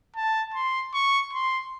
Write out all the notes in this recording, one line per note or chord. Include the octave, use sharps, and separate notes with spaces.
A5
C6
C#6
C6